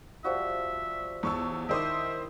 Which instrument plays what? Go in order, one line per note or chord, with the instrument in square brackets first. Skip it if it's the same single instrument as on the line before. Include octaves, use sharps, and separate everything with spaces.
[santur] F3 G3 F#4 [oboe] E5
[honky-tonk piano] E2 C#6 E6 [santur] C#5 A5
[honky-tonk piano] D#3 C5 D#6 [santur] E4 D5 G5 [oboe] E5